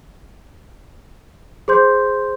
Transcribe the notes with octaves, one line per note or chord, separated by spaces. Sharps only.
G#4 C5 C6 G6